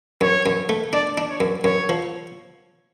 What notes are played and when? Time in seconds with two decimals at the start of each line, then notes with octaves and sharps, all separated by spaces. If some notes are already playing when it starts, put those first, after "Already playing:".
0.21 F#2 C#5
0.46 F#2
0.69 A3
0.93 D4 D5
1.18 D4
1.29 C#5
1.40 F#2
1.64 F#2 C#5
1.89 F3